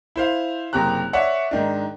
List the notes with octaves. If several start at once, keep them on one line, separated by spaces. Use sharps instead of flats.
E4 C5 F5
F#1 C3 G4 A#5 F#6
C#5 D5 E5 F#5
G#2 D#3 D4